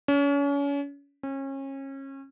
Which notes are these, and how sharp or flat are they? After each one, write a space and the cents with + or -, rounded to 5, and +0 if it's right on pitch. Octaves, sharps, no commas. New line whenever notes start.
C#4 +35
C#4 -30